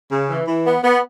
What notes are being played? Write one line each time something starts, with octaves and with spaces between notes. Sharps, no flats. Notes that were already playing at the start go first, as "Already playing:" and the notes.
C#3
E3
E3
B3
B3